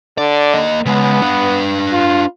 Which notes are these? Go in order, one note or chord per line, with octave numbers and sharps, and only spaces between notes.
D3 D5
A#3 D#5
C#3 G#3 B3
D4 B4
F4